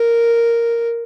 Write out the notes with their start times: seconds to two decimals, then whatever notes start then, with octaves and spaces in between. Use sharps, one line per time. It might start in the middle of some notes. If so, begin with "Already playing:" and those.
Already playing: A#4